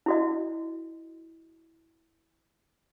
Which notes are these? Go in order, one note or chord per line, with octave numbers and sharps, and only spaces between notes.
E4 F#4 D#5